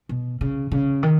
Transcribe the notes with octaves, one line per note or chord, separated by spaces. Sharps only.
B2
C#3
C#3
D#3